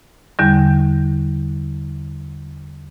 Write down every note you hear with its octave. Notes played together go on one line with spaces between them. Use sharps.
E2 D3 G3